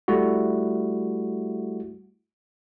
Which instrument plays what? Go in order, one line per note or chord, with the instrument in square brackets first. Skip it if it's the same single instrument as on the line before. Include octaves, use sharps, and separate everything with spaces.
[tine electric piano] G3 A3 E4 F#4